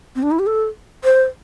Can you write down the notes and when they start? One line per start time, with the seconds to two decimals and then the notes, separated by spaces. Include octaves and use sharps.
0.16 C4
0.23 D4
0.31 E4
0.39 G4
0.47 A4
1.04 C5